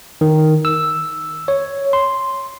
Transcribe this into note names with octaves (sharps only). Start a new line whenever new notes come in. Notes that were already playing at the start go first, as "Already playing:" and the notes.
D#3
E6
C#5
C6